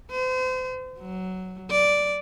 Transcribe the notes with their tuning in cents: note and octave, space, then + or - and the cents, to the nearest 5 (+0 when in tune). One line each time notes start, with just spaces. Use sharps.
C5 -35
F#3 +10
D5 -5